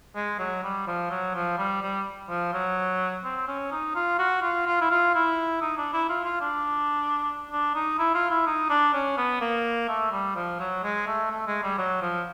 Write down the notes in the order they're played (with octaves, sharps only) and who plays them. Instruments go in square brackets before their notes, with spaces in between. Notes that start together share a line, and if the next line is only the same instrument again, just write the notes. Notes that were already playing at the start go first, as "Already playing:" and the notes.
[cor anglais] G#3
F#3
G3
F3
F#3
F3
G3
G3
F3
F#3
C4
C#4
D#4
F4
F#4
F4
F4
E4
F4
E4
D#4
D4
E4
F4
F4
D4
D4
D#4
E4
F4
E4
D#4
D4
C#4
B3
A#3
A3
G3
F3
F#3
G#3
A3
A3
G#3
G3
F#3
F3